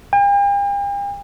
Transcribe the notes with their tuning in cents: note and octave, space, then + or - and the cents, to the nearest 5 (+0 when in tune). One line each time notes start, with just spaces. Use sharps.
G5 +45